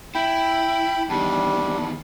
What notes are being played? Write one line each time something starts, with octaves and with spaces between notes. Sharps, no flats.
E4 G5 B5
E2 D#3 G3 D4